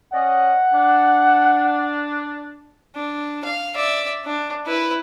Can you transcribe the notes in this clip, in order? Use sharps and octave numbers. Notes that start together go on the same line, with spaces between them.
C#4 D5 D#5 F#5
D4
D4
F5
D5 E5
D4
E4 B4